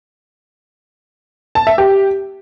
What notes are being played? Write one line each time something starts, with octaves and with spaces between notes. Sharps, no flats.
A5
E5
G4